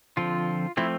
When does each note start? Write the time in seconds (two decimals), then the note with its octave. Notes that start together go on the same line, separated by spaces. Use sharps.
0.17 D3 F3 C4 F4
0.77 F3 A3 C4 E4